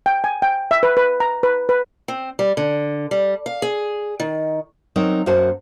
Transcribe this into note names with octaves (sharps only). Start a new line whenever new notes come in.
G5
G#5
G5
E5
B4
B4
A#5
B4
B4
C4
G3
D3
G3
F5
G#4
D#3
F#3 C4 D#4 A#4
F#2 A#3 F#4 C5 F#5 A5